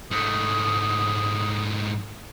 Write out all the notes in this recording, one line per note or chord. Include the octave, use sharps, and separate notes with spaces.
G#2 A3 D#6